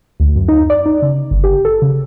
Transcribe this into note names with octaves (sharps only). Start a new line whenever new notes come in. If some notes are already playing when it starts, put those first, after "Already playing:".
D2
F#2
D#4
D5
D#4
C#3
G1
G4
A4
C#3